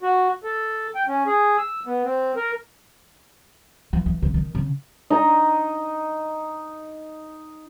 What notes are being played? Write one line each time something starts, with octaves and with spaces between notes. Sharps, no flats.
F#4
A4
G5
C#4
G#4
E6
B3
C4
A#4
E3
E3
C#3
D#3
C#3
D#4 A#5